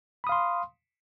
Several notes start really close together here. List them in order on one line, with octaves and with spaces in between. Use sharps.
B5 D#6 F5 C6